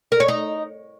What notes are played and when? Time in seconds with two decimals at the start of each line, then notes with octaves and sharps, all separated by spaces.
0.12 A#4
0.20 C#5
0.28 D#4